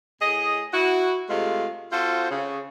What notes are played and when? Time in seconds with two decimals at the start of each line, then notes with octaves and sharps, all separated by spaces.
0.22 A2 G#4 D#5
0.73 E4 F#4
1.30 C3 G#3 A3 F4
1.92 C4 F4 F#4 A4 C5
2.31 C#3